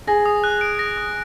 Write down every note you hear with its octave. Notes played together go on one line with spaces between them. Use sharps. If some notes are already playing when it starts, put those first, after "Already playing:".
G#4 A#6
D#6
F#6
D7
A#6
D#6